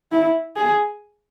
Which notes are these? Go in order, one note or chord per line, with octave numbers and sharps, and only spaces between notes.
E4
G#4